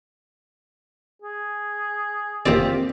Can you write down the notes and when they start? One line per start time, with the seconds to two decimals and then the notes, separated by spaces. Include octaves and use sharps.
1.22 G#4
2.46 D#2 C4 F4 G4 D5